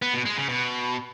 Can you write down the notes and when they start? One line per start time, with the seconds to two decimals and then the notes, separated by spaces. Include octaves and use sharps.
0.02 B3
0.14 B2
0.26 G#3
0.37 C#3
0.49 B2